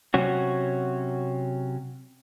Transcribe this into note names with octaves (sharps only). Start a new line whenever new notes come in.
C3 F#3 C#4 F#4